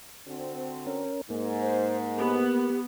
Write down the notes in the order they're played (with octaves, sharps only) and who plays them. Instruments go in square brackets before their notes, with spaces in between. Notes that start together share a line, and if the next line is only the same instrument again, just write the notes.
[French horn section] D3 C4 F#4
[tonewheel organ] C#4 A#4
[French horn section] G#2 [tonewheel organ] A#3
[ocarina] C5
[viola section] B3 [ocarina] G4